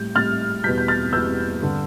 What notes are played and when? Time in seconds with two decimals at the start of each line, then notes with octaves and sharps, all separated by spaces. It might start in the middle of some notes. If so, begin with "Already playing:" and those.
Already playing: A2 G3 G6
0.15 A2 G3 F6 A6
0.64 E2 B2 G3 G6 B6
0.78 G6
0.88 F6 A6
1.13 E2 B2 G3 E6 G6
1.61 G2 D3 G3